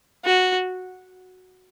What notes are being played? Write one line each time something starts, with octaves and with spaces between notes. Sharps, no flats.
F#4